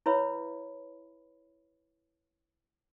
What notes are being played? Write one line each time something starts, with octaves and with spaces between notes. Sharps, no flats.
E4 B4 C#5 E5 B5